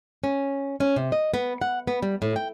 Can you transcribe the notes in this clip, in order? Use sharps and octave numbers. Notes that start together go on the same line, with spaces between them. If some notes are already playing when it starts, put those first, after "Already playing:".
C#4
C#4
C3
D#5
B3
F#5
B3
G3
A2
G5